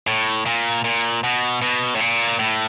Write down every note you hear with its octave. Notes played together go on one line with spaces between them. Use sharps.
A2
A#2
A#2
B2
B2
A2
A#2
A2